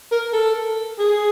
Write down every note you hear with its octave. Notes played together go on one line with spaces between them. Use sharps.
A#4
A4
G#4